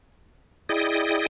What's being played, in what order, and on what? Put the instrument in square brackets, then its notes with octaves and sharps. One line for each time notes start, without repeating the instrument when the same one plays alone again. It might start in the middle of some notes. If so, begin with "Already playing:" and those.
[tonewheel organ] E4 G#4 D5 D#5 G5 D#6